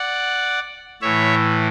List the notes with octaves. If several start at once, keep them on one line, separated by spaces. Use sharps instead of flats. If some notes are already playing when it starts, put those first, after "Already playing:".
Already playing: D5 F#5
A2 E3 C#5 E5